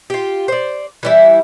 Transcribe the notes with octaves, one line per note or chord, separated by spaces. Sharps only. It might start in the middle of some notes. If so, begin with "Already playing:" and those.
F4 G4
C5 D5
E3 G3 E4